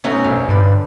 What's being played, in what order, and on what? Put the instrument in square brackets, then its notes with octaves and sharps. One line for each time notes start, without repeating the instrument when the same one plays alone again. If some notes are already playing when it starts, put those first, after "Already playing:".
[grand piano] B2 A3 [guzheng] C#4 D#4 F#4
[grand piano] E1 A#1 F#2 [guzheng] F5
[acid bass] G2 [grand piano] D3 D4 B4